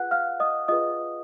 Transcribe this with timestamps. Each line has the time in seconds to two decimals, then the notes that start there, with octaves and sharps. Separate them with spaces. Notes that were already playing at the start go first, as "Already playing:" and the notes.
Already playing: F4 G#4 B4 F#5 F#6
0.11 F5 F6
0.40 D#5 D#6
0.68 F4 G#4 B4 D#5 D#6